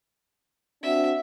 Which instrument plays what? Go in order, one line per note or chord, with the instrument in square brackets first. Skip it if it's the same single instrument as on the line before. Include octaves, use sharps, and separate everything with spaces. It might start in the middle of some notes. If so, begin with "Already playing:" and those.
[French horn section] C4 D4 F#4 [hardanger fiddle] E5